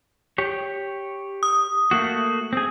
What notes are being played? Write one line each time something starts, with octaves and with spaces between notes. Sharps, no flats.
G4 C#5
D#6
A3 A#3 F#4
C4 G#4